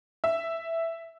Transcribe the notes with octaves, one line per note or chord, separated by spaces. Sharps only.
E5